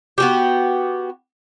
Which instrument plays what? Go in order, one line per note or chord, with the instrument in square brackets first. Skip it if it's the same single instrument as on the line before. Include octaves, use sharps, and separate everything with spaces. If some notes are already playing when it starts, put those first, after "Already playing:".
[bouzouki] B3 F#4 G4